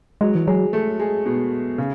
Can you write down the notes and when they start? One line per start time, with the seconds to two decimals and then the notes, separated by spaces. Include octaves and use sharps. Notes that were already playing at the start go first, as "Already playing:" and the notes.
0.21 F#3 G#3
0.35 E3
0.47 F#3 G#3
0.73 A3
1.00 G#3
1.26 B2
1.78 C#3